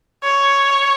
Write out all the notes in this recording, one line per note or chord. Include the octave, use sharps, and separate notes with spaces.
C#5